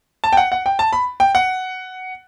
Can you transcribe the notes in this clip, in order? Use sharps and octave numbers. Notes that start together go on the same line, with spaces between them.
A5
G5
F#5
F#5
G5
A5
B5
G5
F#5